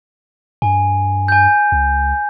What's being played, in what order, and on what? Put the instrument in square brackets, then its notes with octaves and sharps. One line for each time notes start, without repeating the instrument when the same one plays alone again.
[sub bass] G2 [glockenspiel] G#5
[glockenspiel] G#5 G6
[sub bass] C#2